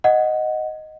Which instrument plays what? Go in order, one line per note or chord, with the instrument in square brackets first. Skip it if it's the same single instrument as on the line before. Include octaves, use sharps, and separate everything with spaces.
[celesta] D#5 F#5